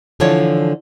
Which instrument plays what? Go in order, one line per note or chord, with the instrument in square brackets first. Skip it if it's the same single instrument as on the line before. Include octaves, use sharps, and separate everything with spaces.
[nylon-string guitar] D3 E3 F3 D4 F4 C#5